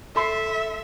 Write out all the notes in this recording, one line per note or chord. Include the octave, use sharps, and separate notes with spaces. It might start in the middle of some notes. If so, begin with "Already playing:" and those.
A4 E5 C6 C7